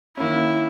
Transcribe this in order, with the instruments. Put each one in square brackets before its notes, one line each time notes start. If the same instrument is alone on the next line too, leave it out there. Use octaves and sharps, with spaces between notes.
[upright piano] D#3 A#3 C#4 [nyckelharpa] E4